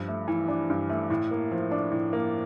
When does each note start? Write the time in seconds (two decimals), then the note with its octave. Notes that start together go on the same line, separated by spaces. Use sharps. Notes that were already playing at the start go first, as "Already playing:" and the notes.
Already playing: G2 F3
0.08 A3
0.28 E3
0.48 D4
0.70 G2
0.89 A3
1.10 A2
1.31 A#3
1.51 F3
1.71 D4
1.92 A2
2.13 A#3